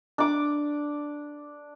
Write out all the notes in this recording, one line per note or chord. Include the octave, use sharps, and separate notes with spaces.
D4 D6